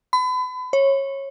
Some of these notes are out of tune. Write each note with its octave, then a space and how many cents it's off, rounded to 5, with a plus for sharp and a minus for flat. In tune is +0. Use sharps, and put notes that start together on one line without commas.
B5 +35
C#5 -20